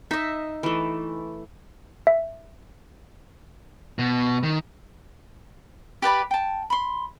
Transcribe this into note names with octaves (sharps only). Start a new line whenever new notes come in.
D#4 D#5 E5
E3 A3
E5
B2
D#3
G4 B4 D5 B5
G5 A5
B5 C6